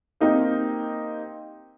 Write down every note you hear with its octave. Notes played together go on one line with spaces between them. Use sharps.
A#3 C4 D#4 G4 A#4